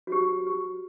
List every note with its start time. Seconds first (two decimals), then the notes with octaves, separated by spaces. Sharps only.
0.07 F#4
0.12 G4
0.47 G4